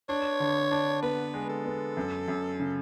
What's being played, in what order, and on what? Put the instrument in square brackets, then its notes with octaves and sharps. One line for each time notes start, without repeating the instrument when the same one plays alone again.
[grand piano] D4 [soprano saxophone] C#5
[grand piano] D3
D4
[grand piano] B3 [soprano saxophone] B4
[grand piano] G#3
[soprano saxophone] A4
[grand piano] B3
F#2
F#2
C#3